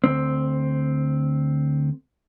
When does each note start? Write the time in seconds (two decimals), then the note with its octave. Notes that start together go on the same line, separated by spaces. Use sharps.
0.04 D2 C4